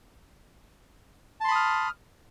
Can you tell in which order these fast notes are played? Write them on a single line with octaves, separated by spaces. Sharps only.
A5 C6 B5 D#6 F6